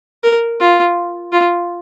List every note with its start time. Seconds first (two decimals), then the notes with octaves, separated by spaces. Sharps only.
0.23 A#4
0.60 F4
1.32 F4